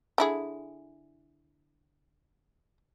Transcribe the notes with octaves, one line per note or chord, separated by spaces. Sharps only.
D3 E4 G#4